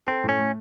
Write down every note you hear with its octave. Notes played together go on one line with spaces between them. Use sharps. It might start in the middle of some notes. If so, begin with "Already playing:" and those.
C4 A4
A2
C#4
A3